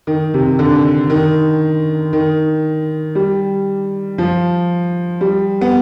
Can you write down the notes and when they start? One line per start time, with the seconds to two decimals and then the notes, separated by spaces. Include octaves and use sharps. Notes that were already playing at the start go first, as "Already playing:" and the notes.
0.07 D#3
0.34 C3
0.59 D3
1.10 D#3
2.13 D#3
3.15 G3
4.18 F3
5.21 G3
5.61 B3